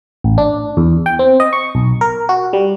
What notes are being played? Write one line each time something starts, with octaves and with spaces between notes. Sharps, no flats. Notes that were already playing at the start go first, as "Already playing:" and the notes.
A1
D4
E2
G5
C4
D#5
C#6
B1
A#4
F#4
G3